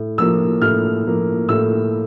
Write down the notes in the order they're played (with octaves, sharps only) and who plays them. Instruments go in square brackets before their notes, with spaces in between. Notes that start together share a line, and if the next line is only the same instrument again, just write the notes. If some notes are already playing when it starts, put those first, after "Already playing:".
Already playing: [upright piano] A2
F3 A#3 E6
A2 F6
F3 A#3
A2 E6